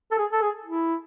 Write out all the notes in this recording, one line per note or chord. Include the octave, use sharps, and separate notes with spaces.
A4
G#4
A4
G#4
E4